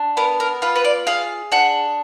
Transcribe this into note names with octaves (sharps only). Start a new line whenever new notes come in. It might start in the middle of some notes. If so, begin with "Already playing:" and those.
Already playing: D4
B3 A#4
A#4
F4 B4
B4
D5
G#4 F5
D4 F#5